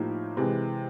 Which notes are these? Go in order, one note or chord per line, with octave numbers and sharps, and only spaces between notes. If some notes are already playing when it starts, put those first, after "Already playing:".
Already playing: A2 F3 A#3 D#4 G4
C3 E3 G#3